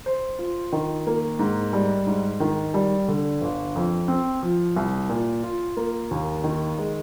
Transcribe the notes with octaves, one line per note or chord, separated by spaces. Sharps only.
C5
F4
D#3
A#3
G#2
G3
G#2
D#3
G3
D3
G1
F2
C4
F3
C2
A#2
F4
A#3
D#2
D#3
G#3